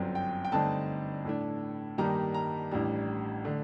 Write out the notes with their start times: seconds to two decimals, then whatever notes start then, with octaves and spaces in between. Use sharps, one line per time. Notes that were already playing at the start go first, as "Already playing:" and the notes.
Already playing: G1 F#2 F#3 C4
0.15 G5
0.45 G5
0.52 G2 D3 A3 C4 D#4 A5
1.25 A2 A3 D4
1.98 G2 D#3 G3 A#3 D#4 A#5
2.34 A#5
2.71 A1 A2 G3 D4
3.45 D3 A3